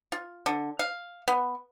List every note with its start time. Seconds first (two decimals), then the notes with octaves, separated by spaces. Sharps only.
0.12 F4
0.46 D3
0.79 F5
1.28 B3